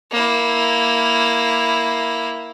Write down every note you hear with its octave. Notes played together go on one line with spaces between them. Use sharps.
A#3 E4